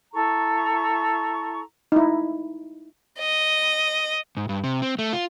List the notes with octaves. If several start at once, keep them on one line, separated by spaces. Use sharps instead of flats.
E4 A4 A#5 C#6
D#4 E4
D#5
G#2
G2
C3
C4
A3
F4